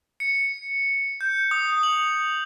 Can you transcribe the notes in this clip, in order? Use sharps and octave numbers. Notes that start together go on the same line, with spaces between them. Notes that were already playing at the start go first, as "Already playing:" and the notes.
C#7
G6
D#6
F#7